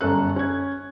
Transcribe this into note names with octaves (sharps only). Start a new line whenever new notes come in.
G1 F#2 C#4 A4 F#6
C#4 G#6